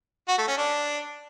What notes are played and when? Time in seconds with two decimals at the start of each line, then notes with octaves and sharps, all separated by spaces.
0.28 F#4
0.38 A3
0.48 C#4
0.58 D4